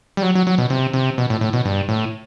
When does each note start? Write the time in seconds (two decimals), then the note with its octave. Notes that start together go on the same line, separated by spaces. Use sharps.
0.17 G3
0.22 F#3
0.35 F#3
0.47 F#3
0.58 B2
0.70 C3
0.93 C3
1.18 B2
1.30 A2
1.41 A2
1.53 B2
1.65 G2
1.88 A2